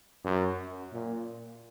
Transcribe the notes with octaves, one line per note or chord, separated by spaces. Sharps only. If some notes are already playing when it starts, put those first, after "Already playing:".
F#2
A#2